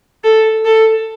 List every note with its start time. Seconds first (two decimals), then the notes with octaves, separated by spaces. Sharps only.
0.24 A4
0.65 A4